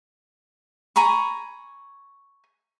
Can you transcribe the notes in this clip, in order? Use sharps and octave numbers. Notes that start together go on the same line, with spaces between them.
G#5 A#5 B5 C#6